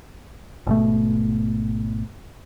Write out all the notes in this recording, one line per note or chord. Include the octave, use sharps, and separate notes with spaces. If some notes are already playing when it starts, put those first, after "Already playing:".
G#1 B2 A3